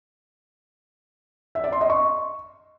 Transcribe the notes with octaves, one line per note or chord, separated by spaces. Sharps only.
E5
D5
C6
D#5
C#6